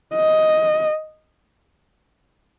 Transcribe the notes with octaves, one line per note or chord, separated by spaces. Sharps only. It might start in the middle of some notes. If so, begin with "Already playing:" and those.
D#5